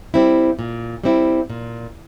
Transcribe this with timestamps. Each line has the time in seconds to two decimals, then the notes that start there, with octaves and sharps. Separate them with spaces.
0.14 G3 C4 E4
0.59 A#2
1.04 G3 C4 E4
1.50 A#2